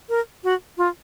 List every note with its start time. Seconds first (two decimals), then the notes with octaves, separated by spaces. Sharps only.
0.09 A#4
0.44 F#4
0.78 F4